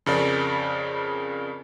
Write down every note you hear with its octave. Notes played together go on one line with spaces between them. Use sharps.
F2 C#3 A#4 D5